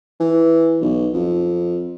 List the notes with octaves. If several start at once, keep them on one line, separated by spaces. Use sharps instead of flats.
E3
B1
F2